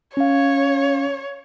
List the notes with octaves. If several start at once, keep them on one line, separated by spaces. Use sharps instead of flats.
C#4 C#5 F5